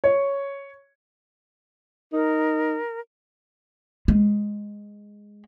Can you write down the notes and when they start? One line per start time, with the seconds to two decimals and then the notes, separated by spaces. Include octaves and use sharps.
0.04 C#5
2.13 D#4 A#4
4.08 G#3